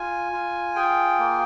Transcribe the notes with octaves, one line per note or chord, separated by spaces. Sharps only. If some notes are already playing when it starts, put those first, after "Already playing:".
Already playing: F4 G#5
F4
G#4 G5
A#3